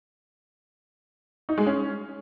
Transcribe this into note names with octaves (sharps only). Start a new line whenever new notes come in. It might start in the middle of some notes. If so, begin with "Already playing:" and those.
D#4
G#3
C#4